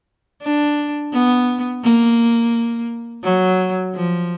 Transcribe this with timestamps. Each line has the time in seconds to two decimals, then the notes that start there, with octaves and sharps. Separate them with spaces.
0.42 D4
1.13 B3
1.84 A#3
3.24 F#3
3.95 F3